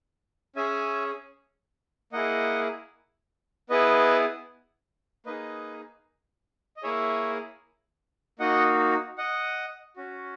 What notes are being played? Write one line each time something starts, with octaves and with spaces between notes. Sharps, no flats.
C#4 G#4 E5 G#5
A#3 E4 G#4 D#5 F#5
B3 E4 G#4 B4 D#5
A#3 D#4 G#4 B4 D#5
D#5
A#3 E4 G#4 C#5 E5
A#3 D#4 F#4 D#5 F#5
D#5 F#5
C#4 F#4